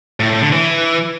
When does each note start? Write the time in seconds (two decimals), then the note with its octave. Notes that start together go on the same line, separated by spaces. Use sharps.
0.20 A2
0.31 A2
0.42 D3
0.52 E3